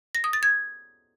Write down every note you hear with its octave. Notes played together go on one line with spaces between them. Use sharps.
A#6
D#6
A6
G#6